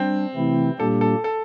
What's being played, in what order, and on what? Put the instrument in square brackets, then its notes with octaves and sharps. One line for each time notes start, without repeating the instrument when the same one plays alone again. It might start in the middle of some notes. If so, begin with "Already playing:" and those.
Already playing: [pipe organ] G3 D4 [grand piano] C4
[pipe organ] C3 E3 A3 C4 E4
[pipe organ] A#2 G3 A#3 D4 G4 [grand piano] A4
[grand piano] A4
A4